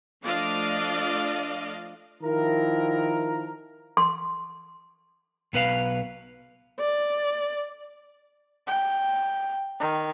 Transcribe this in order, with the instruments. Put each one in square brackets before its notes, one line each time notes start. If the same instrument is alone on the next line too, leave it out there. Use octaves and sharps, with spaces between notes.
[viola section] F3 A3 D4 D5 D#5 F5
[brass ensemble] D#3 F3 E4 A#4
[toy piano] C6
[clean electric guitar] B1 B2 B4 F5
[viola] D5
[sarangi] G5
D#3